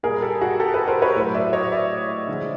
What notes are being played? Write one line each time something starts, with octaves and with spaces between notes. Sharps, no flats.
A#2 G3 G#4 A#4
G4 A4
F#4 G#4
G4 A4
A4 B4
A#4 C5
B4 C#5
A2 F#3
D5 E5
C#5 D#5
D5 E5
D3 F3 G#3